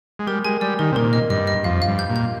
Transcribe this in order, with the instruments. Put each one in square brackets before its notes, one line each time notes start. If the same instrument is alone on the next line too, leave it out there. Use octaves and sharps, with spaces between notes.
[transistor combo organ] G#3
[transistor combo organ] G3 [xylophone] A#4
[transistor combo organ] G#3 [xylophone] G#5
[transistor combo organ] G3 [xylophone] D5
[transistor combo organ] D#3 [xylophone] A#4
[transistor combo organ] C3
[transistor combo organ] A#2 [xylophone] A#4
[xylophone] D#5
[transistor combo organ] G2 [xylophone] D#5
[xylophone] D#5
[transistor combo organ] F2 [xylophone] F5
[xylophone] F5
[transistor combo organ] G2
[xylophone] G6
[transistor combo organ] A#2
[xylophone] G6